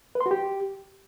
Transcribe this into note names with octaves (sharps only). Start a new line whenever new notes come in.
B4
C6
F#4
G4